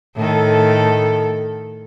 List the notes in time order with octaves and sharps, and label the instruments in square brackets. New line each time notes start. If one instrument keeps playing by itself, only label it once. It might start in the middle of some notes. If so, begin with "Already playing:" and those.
[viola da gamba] A2 D#3 A4